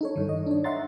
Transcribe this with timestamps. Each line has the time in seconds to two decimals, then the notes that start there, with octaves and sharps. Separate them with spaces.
0.01 D#4 A4 C#5
0.16 G2 D#3
0.29 D#5
0.46 D4 C#5
0.64 D#5 E5 F#5 A#5 C6 A6